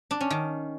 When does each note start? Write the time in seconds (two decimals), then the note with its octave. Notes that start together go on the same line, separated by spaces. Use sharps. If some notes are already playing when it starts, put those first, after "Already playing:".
0.11 D4
0.21 C#4
0.30 D#3